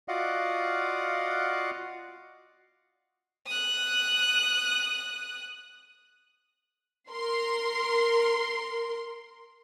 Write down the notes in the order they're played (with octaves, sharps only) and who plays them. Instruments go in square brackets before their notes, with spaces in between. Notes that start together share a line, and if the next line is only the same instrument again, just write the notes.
[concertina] F4 F#4 D5 D#5 F5 F#5
[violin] D#6 F#6
[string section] A#4 C6